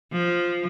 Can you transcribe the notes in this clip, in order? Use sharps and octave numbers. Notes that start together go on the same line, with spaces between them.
F3